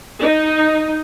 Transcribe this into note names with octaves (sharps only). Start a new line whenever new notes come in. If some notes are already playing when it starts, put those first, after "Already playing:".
D#4